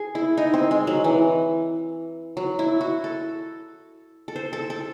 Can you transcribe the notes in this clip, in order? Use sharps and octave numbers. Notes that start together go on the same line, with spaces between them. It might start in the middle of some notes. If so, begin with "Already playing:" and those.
Already playing: G#4
E4
D#4
C4
G#3
F#3
E3
F#3
E4
F#4
A4
A4
C5
A4
A4